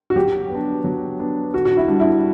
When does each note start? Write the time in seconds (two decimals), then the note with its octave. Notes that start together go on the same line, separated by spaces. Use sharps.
0.10 F#4
0.16 F#3 G4
0.50 B3 D4
0.84 F#3
1.19 B3 D4
1.54 D3 F#4
1.65 F#4
1.77 E4
1.88 G3 D4 F#4
2.00 E4